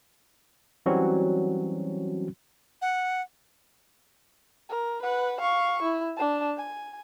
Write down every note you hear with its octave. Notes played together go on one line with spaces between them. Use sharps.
E3 F#3 G3 C4 C#4 F#4
F#5
A#4
B4 F#5
F5 C#6
E4
D4 A5
G#5